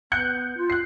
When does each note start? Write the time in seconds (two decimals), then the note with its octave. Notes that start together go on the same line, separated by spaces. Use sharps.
0.12 B3 F#6 G6 C#7
0.57 F4
0.70 F#6 C7